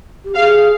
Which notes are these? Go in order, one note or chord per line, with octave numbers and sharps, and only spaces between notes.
G4
G#4 F5